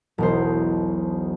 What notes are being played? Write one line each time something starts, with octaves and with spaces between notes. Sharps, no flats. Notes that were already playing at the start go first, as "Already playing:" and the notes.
E1 B1 C5